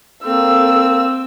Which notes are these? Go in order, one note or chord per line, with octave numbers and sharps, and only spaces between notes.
A#3 C4 A4 E6